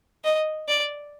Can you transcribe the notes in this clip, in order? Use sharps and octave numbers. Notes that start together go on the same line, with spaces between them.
D#5
D5